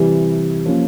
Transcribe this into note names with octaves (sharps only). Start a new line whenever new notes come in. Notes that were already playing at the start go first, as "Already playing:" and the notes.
Already playing: C3 E3 G3
F3 A#3 C#4